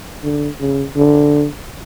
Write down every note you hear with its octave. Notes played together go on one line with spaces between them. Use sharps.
D3
C#3
D3